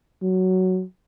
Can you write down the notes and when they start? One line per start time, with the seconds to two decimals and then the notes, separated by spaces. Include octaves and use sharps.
0.22 F#3